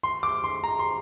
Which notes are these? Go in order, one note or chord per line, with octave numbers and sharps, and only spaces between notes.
C6
D6
C6
A#5
C6